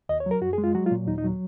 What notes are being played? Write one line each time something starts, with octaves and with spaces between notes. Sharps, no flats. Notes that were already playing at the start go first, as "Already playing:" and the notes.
D#2 D#5
C#5
F#3 A#4
F#2 F#4
G#4
G#3
F4
F#3 F#4
F4
A#2
D#2 D#4
D#4
F#3